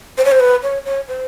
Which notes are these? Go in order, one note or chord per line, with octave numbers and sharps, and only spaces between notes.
C5
C#5
C5
B4
C#5
C#5
C5